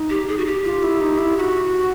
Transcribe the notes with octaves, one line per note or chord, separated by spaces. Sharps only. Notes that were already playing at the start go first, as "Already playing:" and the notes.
Already playing: D#4
G4
G#4
F#4
G4
F4
E4
D#4
E4
F#4